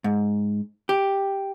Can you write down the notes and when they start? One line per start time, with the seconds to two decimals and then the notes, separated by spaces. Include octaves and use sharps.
0.04 G#2
0.89 G4